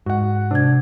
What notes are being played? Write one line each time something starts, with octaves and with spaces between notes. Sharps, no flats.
G#2 F#4 F#5
C3 D4 G#6